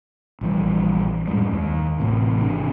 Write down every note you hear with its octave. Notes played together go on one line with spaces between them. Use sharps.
A#1 E3 G3
F#2 A2 G3 G#3
D#2
A1 A2 C3
G#1 C3 D4